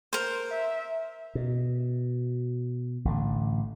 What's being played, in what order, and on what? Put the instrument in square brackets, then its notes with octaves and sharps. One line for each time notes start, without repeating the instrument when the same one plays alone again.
[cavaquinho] A#4 C5
[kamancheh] E5
[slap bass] B2
A1 A2 D3